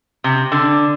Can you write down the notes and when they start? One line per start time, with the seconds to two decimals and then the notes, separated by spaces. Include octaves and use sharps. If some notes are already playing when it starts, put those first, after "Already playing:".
0.24 C3
0.52 D3